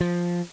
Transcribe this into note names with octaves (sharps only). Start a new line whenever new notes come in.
F3